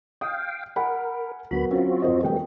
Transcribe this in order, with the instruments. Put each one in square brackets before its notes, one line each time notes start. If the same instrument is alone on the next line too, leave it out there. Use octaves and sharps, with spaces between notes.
[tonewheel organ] F5 G5 [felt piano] D#6
[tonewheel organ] A#4 [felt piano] F#5 G#5 B5
[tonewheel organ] D2 B5 [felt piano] F#3 B3 A#4
[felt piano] F#3 C#4 [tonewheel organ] C4 F4 F#4
[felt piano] F2 C5 D#5
[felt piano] E1 G5 [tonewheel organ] G3 A3 B3